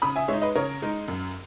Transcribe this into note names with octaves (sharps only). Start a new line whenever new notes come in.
C#3 B5 D#6
E5 G#5
G#3 D#4 C#5 E5
B4 D#5
C#3 A#4 C#5
G#3 D#4
F#2